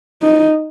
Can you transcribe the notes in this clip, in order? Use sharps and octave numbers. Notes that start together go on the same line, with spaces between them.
D#4